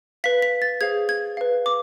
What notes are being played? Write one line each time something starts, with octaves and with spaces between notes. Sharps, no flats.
B4 F5 B6
B6
A6
G#4 C5 F5 G#6
G#6
B4 F5
D6